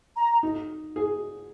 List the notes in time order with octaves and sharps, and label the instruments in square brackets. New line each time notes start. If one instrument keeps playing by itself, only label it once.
[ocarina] A#5
[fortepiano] D#4
G#4